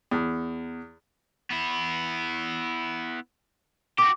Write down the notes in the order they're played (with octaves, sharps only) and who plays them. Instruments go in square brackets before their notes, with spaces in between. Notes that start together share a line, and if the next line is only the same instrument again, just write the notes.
[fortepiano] E2
[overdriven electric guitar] B3 E4
[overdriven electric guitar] F#4 G4 [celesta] D6